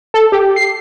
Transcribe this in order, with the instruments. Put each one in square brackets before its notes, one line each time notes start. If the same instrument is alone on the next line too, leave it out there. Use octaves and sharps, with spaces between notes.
[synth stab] A4
G4
C7